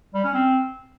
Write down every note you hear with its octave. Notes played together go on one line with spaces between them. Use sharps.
G3
C#4
C4